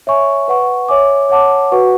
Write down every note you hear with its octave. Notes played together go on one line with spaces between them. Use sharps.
C#5 E5 G#5 C#6
B4 F#5 C#6
C#5 E5 G#5 D6
C#5 F#5 A5 D6
F#4 B4 F#5 C#6